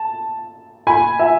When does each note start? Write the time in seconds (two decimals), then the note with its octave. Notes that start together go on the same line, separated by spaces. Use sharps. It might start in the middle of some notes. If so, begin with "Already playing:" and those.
Already playing: A5
0.87 G#5 B5
1.19 E5 G#5